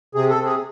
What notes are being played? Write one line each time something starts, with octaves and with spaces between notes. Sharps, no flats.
C3 G#4
A4
C3
G#4